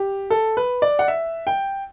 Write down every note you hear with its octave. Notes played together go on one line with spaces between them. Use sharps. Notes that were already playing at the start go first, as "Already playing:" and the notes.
Already playing: G4
A4
B4
D5
F#5
E5
G5